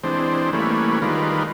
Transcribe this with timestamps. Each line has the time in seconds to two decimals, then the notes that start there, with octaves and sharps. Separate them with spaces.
0.04 E3 G#3 C4 D4 C5
0.53 E3 G3 A3 A#3 C#4 B4
1.02 D#3 G3 G#3 F4 A#4 B4